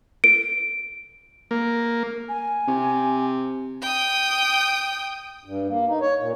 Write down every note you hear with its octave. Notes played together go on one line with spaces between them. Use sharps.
D7
A#3
G#5
C3
G5 D#6
G2
A#3
D#4
C#5
A#2